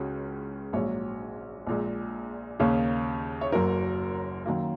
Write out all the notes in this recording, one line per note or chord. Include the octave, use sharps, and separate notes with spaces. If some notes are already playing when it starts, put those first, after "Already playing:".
Already playing: C#2 C#3 G#3 F#4
A#1 G#2 F#3 C#5
A#1 A#2 G#3
D#2 C#3 A#3
C#5
F#1 F#2 F#3 A#4
F#2 D#3 F#3 A#3